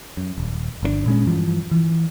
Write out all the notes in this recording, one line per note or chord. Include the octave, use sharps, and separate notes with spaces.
F#2
D#1
G1 D#3 D4
A#2 G#3 C#4
G2 E3 F3
E3